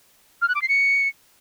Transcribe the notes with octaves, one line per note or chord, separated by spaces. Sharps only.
F6
F#6
D6
C7
C#7